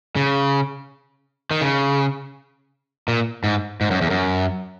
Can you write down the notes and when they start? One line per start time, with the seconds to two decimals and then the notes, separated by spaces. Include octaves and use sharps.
0.16 C#3
1.51 D#3
1.61 C#3
3.08 A#2
3.44 G#2
3.81 G#2
3.91 F#2
4.01 E2
4.10 F#2